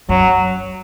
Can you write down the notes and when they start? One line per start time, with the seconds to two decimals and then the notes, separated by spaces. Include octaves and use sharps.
0.09 F#2 F#3